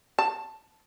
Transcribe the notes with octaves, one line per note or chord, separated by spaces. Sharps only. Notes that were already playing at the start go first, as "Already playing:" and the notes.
A5